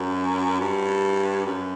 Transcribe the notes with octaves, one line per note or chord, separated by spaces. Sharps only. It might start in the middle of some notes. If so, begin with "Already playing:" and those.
Already playing: F#2
G2
F#2